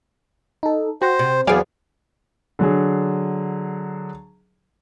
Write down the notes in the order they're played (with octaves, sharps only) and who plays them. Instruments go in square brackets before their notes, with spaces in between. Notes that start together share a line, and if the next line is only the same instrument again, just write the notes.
[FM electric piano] D#4 A4
[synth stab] F#4 [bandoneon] C5 [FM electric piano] G5 A#6
[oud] C3
[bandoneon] E2 B3 [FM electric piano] F#3 [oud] C4 G#4 [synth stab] D5 F5 G#5
[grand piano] D3 F#3 G#4